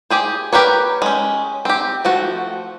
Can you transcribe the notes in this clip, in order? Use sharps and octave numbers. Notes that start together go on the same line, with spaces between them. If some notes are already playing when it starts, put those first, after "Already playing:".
G4 G#4 C5
G4 A#4 B4 C#5
G#3 C#4
C4 G4
F3 A3 F#4